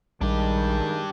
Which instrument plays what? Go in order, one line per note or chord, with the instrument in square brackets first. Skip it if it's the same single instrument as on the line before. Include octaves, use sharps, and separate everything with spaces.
[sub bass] A#1 [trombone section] D#3 G#3 [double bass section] G3 [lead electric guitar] D4 G4